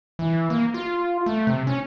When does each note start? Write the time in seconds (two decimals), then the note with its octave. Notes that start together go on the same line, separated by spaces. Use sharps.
0.19 E3
0.50 A#3
0.74 F4
1.26 A3
1.47 C3
1.67 C#4